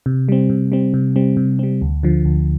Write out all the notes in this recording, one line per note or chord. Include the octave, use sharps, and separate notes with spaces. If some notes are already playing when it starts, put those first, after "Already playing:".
C3
G3 C4
C3
G3 C4
C3
G3 C4
C3
G3 C4
D2
D3 F3
D2